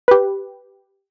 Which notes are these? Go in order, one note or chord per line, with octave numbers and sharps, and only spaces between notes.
G4 B4